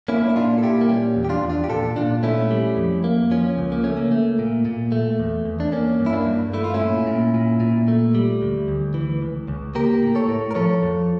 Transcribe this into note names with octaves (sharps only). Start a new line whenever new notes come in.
A#3 C#4 E4
D4
E4
A#2 D4 F4
A4
A#2 E4 G4
A#3
G3 C#4
E2
G4
D4 F4
E2
D4 F4
G4
A#2 F4 A4
A#2 D4 F4
A3 C#4 E4
G3
F2
A#3
F3 C#4
C#2
A#3
A3 C#4
A#3
A3
A#2
A#2
A3
E2
E2
D4
A#3 C#4
G2
E4
A#3 D4
G2
A3 E4
F4
C#4 E4
A#2
A#2
A#2
A#2
A3
G3
D2
D2
E3
C#2
C#2
A#3 G4 A#4
A2
A4 C#5
A2
A#4
F3 A4 C#5
F2